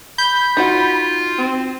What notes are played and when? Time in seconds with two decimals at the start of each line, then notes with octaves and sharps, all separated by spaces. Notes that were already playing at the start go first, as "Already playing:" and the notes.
0.18 B5 G6
0.57 D#4 F4 F#4 F#5
1.39 C4